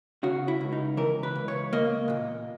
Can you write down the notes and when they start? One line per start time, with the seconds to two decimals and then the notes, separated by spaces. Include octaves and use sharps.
0.23 C#3 F#4
0.48 E4
0.61 C#2
0.72 D#4
0.97 E3 A#4
1.23 B4
1.35 C#2
1.48 C#5
1.73 A#3 D#5
2.10 A#2